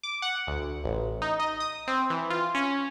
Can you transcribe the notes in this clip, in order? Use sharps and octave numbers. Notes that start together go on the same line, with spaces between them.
D6
F#5
D2
A1
D#4
D#5
D#6
C4
E3
F4
C#4